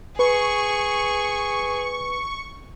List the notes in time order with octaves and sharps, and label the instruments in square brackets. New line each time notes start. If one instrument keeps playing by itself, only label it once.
[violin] G#4 [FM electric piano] B4 [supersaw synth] C#6